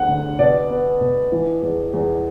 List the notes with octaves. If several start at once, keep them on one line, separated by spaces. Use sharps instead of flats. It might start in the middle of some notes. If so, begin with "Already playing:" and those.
Already playing: D2 F#5
D3
B2 D5
B3
B2
E3
E2
E2